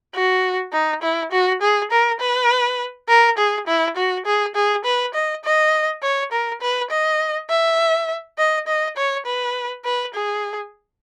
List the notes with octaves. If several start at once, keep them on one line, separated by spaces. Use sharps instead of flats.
F#4
D#4
E4
F#4
G#4
A#4
B4
A#4
G#4
E4
F#4
G#4
G#4
B4
D#5
D#5
C#5
A#4
B4
D#5
E5
D#5
D#5
C#5
B4
B4
G#4